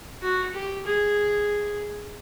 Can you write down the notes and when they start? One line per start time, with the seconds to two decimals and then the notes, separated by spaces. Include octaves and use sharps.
0.22 F#4
0.54 G4
0.86 G#4